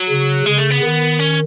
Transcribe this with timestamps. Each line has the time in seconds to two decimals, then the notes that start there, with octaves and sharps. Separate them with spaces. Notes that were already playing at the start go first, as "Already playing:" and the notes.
Already playing: F#3
0.09 C#3
0.46 C#3 G#3
0.58 A3
0.70 B3
0.83 D#3
1.19 C#4